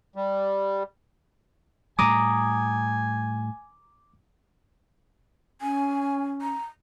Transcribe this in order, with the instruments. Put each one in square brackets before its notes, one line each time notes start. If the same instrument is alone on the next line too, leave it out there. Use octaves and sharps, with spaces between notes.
[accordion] G3
[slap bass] A2 G3 [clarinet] G#5 [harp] A#5 D#6 [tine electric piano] D6
[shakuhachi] C#4 [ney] G#5
[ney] A#5